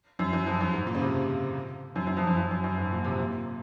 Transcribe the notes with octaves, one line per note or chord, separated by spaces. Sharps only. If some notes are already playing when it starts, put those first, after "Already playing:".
F#2
F#2
F2
F#2
G#2
A#2
C#3
C3
F#2
F#2
F2
F#2
F2
F#2
F#2
G#2
A#2
C3
A#2